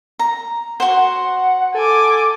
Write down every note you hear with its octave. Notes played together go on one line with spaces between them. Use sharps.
A#5
F#4 C5 F#5
A4 G#5 D6